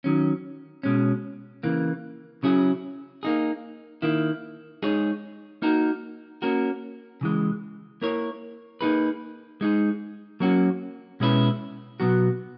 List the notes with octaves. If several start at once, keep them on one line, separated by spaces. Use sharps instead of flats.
D#3 F#3 C#4
B2 G#3 C#4
C#3 E3 A#3
C#3 F#3 C#4 E4 G#4
A#3 D#4 G#4
D#3 A#3 E4
G#3 D#4 G#4 C#5
A#3 D#4 F#4 A#4
A#3 C#4 F#4 A#4
C#3 E3 G#3
A#3 E4 A#4 C#5
A#3 D#4 G#4 B4
G#3 D#4 G#4
F#3 A#3 C#4 F#4
B2 G#3 C#4 E4 B4
B2 F#3 B3 F#4